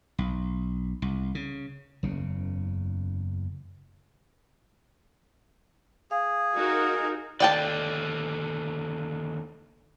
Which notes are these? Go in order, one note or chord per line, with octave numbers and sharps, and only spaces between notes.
B1
C2
C#3
F#1 E2 C#3
G#4 F5
D#4 F#4 A#4
D#2 D3 D5 G5 A5